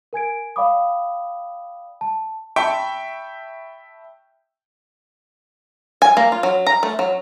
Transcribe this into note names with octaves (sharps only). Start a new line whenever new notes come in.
A#4 G#5 G#6 D7
D5 F5 G5 B5 D6 D#6
A5
E5 G5 A5 B5 C#6
G#5
A#3
F4
F#3
A#5
A3
F#3